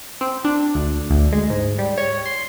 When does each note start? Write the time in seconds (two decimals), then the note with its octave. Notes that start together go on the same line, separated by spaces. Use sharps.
0.21 C4
0.45 D4
0.75 D2
1.10 D2
1.33 G#3
1.50 G#2
1.78 G3
1.98 C#5
2.26 C6